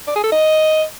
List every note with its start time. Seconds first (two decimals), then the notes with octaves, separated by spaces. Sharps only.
0.07 D5
0.16 G#4
0.24 A4
0.32 D#5